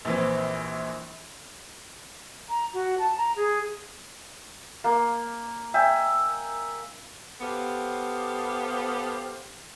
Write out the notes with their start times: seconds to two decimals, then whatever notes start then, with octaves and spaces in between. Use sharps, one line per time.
0.05 A#1 E3 C4
2.49 A#5
2.74 F#4
2.98 A5
3.17 A#5
3.36 G#4
4.84 A#3
5.74 E5 G5 G#5
7.41 B3 G4 A4 C5 F5